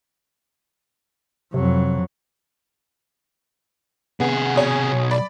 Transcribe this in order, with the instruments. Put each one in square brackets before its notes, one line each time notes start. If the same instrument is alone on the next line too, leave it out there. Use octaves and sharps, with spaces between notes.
[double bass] F2 F#3 [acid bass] C3
[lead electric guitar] C3 G#4 [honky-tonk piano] B3
[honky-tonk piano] B2 C#5 G#5
[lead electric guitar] B1
[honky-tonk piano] D5 B5